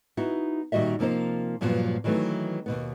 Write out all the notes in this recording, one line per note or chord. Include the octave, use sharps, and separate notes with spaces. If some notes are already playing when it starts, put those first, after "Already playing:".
B3 D#4 E4 F#4
A#2 D#3 G3 F#4 D#5 E5
C3 F3 A#3 D#4 C5
G2 A#2 F3 F#3 B3
D#3 E3 F#3 A3 B3
D#2 B2 B3